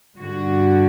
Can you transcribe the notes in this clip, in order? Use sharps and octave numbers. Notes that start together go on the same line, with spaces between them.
G2 D3 F#4